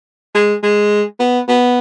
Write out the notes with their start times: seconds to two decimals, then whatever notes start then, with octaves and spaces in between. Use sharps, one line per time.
0.35 G#3
0.63 G#3
1.20 B3
1.48 B3